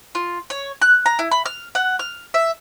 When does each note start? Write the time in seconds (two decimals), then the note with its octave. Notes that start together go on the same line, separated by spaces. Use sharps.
0.15 F4
0.50 C#5
0.82 F#6
1.06 A#5
1.19 E4
1.31 B5
1.46 F6
1.75 F#5
1.99 F6
2.34 E5